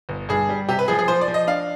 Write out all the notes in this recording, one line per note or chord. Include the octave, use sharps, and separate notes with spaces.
G1
G2 G#4
G3
C3 G4
B4
F3 G#4
G#4
F3 C5
D5
F3
D#5
D4 F5